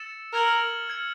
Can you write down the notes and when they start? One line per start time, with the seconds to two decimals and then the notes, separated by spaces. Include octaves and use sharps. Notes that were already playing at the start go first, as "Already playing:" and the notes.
Already playing: E6 A6 C#7 E7
0.33 A#4 F6 G#6 C#7 F#7
0.88 F6 G#6 C#7 F#7